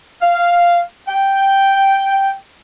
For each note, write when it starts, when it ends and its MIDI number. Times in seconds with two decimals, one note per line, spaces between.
0.22 0.80 77
1.08 2.34 79